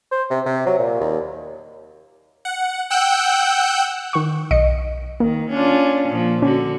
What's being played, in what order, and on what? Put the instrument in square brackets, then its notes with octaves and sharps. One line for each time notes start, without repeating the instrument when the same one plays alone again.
[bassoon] C5
C3
C3
F#3
A#2
D#2
[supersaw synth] F#5
F#5 G5 E6 F#6 G6
[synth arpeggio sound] D#3 C#6
B1 D#5 C#7
[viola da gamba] D#3 [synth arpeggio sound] A#3
[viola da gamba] C#4 D4 F4
A#2 F3
[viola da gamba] D3 F#4 [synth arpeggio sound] C#4